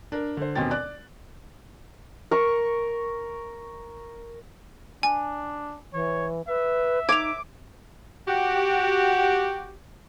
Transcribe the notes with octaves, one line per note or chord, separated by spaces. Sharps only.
D4 A#4
D3 C5
D#2 B2 C4 C#4 G5 A6
D5 F#6
A#4 C#6
D4 G#5
E3 C#5
B4 E5
D#4 D6 G#6 F7
F#4 G4